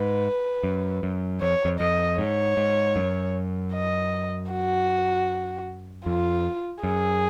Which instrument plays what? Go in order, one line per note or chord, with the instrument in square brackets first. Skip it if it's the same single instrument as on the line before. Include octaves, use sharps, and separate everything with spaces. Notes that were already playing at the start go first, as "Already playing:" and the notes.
Already playing: [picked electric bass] G#2 [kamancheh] B4
[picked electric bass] F#2
F#2
[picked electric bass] F2 [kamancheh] C#5
[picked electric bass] F2
[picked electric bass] F2 [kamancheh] D#5
[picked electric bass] G#2 [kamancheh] C#5
[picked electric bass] G#2
F#2
[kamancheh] D#5
F#4
[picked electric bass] F2 [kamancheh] F4
[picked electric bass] F#2 [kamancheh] G#4